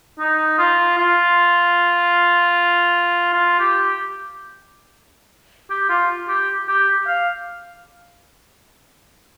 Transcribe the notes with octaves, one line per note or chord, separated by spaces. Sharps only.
D#4
F4
F4
F4
G4
G4
F4
G4
G4
F5